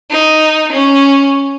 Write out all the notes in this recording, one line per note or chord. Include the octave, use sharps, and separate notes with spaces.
D#4
C#4